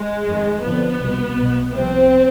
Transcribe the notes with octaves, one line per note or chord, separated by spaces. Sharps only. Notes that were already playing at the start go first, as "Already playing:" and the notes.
Already playing: G#3
F2 D#3
F2 D3 F3 B3
C2 B2
B1 B2
C2 C3 F3 C4